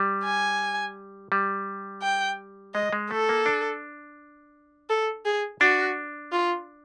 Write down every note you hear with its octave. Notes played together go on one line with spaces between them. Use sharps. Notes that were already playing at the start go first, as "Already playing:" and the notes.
Already playing: G3
G#5
G3
G5
G#3 D#5
G#3
A3 A4
A#3
D4
A4
G#4
D4 F#4
F4